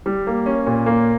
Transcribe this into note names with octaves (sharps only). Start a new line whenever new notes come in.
G3
A#3
C#4
A#2
A#3